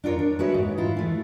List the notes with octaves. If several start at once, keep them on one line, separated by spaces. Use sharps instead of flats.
D4 F4 A#4 C#5
D4
G#3 F#4 B4 C#5 E5
G#2
E4 F4
E3 A3